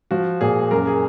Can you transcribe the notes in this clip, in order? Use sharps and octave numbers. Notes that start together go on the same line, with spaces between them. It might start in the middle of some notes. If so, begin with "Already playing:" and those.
F3 F#4
A#2 G#4
F#2 A#4
G#4